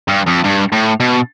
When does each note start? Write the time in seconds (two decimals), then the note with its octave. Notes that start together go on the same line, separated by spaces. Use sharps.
0.09 G2
0.28 F2
0.45 G2
0.73 A2
1.00 B2